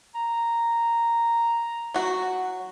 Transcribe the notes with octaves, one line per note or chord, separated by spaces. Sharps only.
A#5
F#3 F#4